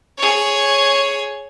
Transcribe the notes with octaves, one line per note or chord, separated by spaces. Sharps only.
G#4 C#5